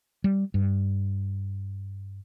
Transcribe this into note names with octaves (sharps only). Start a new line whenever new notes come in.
G3
G2